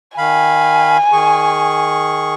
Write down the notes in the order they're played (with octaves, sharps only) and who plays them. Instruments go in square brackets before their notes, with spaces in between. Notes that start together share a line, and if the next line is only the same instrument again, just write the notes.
[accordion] D#3 F5 B5 [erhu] G#5
[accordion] D#3 G#4 C#6